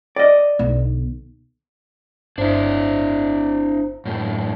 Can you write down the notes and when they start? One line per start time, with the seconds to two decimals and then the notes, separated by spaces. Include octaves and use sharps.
0.16 D5 D#5
0.59 B1 D3
2.38 G1 D4 E4 C5
4.05 F#2 A2